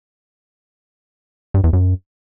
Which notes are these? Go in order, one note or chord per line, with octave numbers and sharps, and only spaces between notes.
G2
E2
F#2